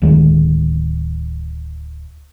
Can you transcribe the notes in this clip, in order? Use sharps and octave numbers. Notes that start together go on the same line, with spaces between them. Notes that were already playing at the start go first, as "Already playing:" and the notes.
D1 D#3 G#3